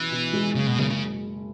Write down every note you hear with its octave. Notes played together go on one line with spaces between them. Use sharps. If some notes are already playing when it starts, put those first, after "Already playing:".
Already playing: B1 E3 C#4
B2
G#3
F#1 C#3
B2
F#1 C#3
C#3